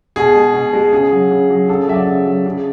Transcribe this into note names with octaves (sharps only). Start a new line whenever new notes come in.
B2 G#4
G#3
B2
G#3
C#3 G#4
F#3
C#3
F#3
C#3 A4
F#3 E5
D5
C#3
F#3
C#3